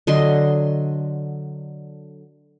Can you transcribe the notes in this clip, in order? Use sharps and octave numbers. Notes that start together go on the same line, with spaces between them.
D3 F#3 D#5 C6